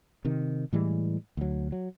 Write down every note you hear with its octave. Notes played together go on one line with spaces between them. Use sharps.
C3 D#3
A2 E3 G3 G#3
D2 F#3
F#3